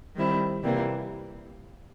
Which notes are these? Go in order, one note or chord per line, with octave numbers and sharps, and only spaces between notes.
D#3 G3 C4 E4
C3 E3 G3 A#3